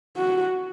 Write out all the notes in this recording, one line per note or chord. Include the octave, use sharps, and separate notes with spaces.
F#4